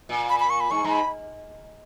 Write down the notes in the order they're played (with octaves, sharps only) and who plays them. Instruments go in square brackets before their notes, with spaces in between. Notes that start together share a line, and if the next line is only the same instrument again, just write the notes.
[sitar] A#2
[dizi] B5
B5
C#6
B5
[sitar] G#2 [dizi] C#6
[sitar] G#2 [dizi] A#5
[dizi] B5